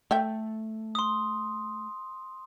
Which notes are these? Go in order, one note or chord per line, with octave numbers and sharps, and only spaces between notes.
A3 A4 E5 G5
C6 D#6